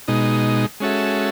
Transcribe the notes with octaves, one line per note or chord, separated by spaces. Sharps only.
B2 G#3 D#4
G#3 C#4 F#4 A4 E5